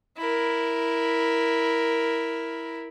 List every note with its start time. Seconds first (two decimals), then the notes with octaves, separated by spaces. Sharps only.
0.18 E4 A#4